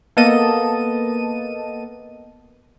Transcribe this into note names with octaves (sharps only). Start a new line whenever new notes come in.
A#3 B3 A4 D#5 A5 D#7